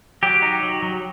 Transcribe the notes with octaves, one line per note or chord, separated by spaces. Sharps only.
F#3 G4
D#4
F#3
F#3